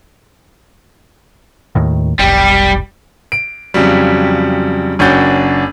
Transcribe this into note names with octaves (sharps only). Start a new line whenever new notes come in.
D#2 A2 D#3
F1 B1 G3
D7
F2 C#3 F#3 G3
F#1 C#4 D4 F#4 G6 A6